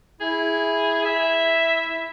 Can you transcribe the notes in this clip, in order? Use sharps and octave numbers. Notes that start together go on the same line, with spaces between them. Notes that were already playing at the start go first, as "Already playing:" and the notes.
E4 G#4
E5